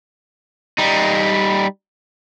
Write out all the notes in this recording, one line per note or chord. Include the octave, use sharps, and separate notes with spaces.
G3 D#4